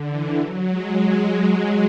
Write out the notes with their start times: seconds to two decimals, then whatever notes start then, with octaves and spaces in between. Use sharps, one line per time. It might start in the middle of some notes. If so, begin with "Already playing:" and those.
Already playing: D3
0.09 E3
0.38 F#3
0.68 G#3